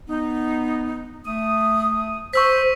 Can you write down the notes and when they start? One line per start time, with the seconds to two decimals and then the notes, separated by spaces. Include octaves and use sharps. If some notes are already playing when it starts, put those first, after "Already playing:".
0.09 B3 D#4
1.26 A3 D#6
2.33 C5 C#6 E6 B6